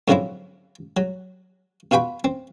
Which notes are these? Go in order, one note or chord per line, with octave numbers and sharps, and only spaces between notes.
G#2 D3 F3 F#3 C4 E4
F#3
B2 F4 F#4 G5 B5
C4